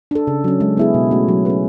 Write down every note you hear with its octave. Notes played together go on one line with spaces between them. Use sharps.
D4 A4
C#3
F#3 C#4
G#3
B3 E4 G#4
B2
A3 C#4 F#4
F#3
C#4 G#4 B4